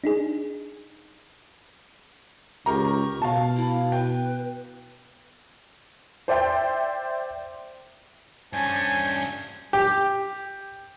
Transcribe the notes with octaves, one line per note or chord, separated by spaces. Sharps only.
D4 D#4 G#4
C#2 G4 A#4 A#5 C#6
B2 F5 A5
E4
B4 G5
C5 D5 E5 G5 C6
G2 C#4 C5 D5 G#5 A5
G4